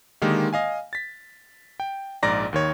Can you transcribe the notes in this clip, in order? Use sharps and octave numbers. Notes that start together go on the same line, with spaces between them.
D3 D#3 G#3 A#3 D#4 G4
D#5 F5 G#5
A6 B6
G5
A#1 G#2 D5 A#5 A#6
D#2 D#3 C#5